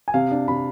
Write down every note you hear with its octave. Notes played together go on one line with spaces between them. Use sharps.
G#5
C3 F5
D4
C3 B5